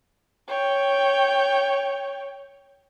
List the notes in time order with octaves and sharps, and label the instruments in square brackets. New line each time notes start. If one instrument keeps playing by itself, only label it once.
[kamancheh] C#5 G5